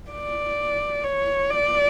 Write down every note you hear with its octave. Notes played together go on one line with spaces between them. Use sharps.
D5
C#5
D5